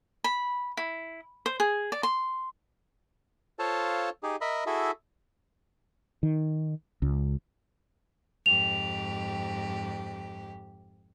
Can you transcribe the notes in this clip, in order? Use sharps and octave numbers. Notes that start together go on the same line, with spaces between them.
B5
E4
C5
G#4
D5
C6
F4 A4 C5 C#5 F5 A5
D#4 G4 G#4
A#4 D#5 E5 B5
E4 F#4 G#4 A4 E5
D#3
C#2
F2 G#2 G4 F7